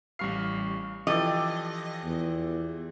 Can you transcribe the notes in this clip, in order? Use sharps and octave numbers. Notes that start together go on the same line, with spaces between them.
A1 G3 F5 B5 C#6 C7
E3 F3 G4 A4 D5 D#5
E2